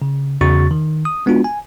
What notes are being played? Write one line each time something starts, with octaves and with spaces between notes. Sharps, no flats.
C#3
E2 C#3 F#4 C#6 A6
D#3
D#6
G#3 B3 D4 F4 F#4
G#5